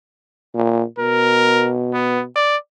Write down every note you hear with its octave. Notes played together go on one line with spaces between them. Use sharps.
A#2
B2 A#4
B3
D5